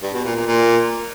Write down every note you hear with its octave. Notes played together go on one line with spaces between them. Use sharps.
G2
B2
A#2
A#2
A#2